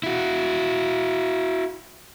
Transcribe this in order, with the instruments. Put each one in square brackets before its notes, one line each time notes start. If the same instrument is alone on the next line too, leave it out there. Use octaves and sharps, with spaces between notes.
[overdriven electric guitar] E4 F#4